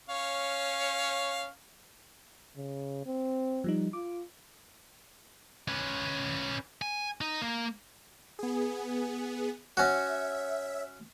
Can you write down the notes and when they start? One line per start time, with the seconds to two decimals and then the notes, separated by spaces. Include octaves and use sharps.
0.09 C#4 C#5 F5
2.57 C#3
3.06 C4
3.64 F3 G3 D#4
3.93 F4 D6
5.68 C#4 B4
6.82 G#5
7.21 D#4
7.42 A#3
8.39 B3 G#4
9.77 C#4 F#4 C#5 E5